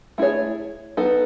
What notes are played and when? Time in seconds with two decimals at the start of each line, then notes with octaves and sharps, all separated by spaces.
0.18 A3 E4 G#4 C#5
0.97 B3 D#4 A4